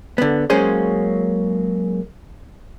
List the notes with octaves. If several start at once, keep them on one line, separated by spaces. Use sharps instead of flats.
D3 B3
F#3 G#3 A#3 C#4 G#4 C5